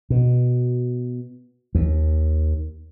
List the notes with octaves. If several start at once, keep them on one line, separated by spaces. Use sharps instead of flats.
B2
D#2